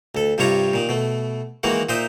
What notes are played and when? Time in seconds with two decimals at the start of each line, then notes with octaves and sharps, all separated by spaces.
0.15 D2 A4
0.38 G2 C3 G3 F4 C#5 A#5
0.73 A#2 D#3
0.89 B2 A3
1.63 D#3 E3 G#3 A#3 F#4
1.89 A#2 D#4 C5 D#5 E5